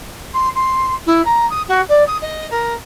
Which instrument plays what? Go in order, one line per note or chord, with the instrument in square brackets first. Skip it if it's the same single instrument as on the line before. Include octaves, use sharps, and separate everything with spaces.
[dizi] C6
C6
E4
A#5
D#6
F#4
D5
D#6
D#5
A#4